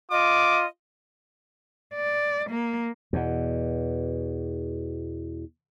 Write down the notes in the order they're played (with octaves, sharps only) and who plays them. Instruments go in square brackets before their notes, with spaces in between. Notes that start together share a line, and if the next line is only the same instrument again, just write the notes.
[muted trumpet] F4 [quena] D#5 [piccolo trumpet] D6
[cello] D5
A#3
[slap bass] E2 B2